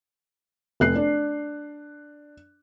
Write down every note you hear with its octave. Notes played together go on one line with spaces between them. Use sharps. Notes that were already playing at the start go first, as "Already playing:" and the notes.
F1 F#6 C7
D4